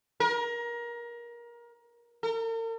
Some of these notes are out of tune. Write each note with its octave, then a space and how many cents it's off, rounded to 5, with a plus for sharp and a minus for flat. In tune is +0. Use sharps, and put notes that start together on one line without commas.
A#4 +25
A#4 -45